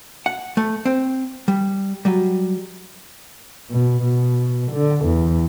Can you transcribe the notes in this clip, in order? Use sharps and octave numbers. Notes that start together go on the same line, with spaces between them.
F#5
A3
C4
G3
F#3 G3
B2
B2
D3
E2